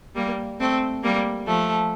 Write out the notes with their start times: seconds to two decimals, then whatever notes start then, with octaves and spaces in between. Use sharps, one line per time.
0.16 G3 A#3
0.60 A3 C4
1.03 G3 A#3
1.47 F3 A3